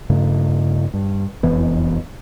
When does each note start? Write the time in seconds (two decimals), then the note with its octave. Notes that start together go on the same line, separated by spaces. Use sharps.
0.10 G2 C#3 A3
0.94 G2
1.43 E1 F2 E3 B3